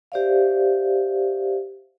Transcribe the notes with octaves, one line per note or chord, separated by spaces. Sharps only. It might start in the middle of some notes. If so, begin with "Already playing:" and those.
G4 C5 D5 E5 F5